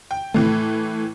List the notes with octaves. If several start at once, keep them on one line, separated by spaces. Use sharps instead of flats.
G5
A2 E3 A3